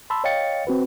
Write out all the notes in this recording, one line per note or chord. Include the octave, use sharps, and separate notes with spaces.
A5 B5 C6 E6
C#5 D#5 F5 G5 A6 C#7
C4 F#4 B4